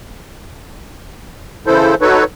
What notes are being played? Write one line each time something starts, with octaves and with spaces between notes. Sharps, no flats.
C#3 E3 E4 A4 C5
D#4 F#4 A4 B4 C#5